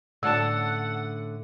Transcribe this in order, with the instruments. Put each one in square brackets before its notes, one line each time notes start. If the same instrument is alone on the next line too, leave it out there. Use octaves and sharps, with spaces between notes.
[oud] A2 D3 C#4 [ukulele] D4 A4 A5 [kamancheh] F#5 [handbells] E6